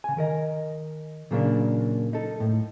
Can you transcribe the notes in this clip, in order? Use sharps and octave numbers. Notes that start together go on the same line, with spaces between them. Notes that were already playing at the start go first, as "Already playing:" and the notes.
C#3 G#5
D#3 A#4 D#5
A#2 C#3 F#3 A#3 B3 D4
D#4 A4
A2